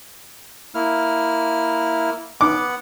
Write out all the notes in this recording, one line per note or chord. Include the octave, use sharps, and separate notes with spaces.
A#3 E4 F6
B3 F#5 D6